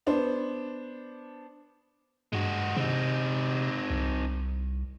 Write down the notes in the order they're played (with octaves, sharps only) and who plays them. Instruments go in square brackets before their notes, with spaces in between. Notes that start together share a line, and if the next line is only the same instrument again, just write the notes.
[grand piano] B3 D4 C5
[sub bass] G2 [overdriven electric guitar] G#3 F#4
[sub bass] C3 [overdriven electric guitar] C4 D#4
[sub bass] C2